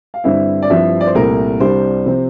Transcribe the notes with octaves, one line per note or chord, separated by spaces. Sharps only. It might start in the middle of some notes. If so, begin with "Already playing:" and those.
F5
G2 D3 G3 C4 E4 E5
D5
G2 F3 C4 E4 E5
D5
C5
C2 A#2 A3 A#4
C2 C3 G3 D4 C5
C3 F3 C4